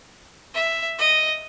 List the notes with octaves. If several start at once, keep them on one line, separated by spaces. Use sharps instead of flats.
E5
D#5